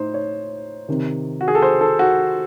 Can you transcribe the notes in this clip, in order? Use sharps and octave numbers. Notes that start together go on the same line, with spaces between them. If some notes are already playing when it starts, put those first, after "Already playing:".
Already playing: A2 D#4 C5
C#5
C3 D#3
F#4
G#4
A4
C5
A4
F#4